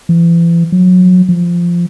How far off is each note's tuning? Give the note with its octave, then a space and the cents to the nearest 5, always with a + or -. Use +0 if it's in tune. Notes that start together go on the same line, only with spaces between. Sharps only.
E3 +40
F#3 -25
F3 -10